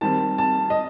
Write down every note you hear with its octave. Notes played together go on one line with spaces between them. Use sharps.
D#3 G3 C4 A5
A5
D#5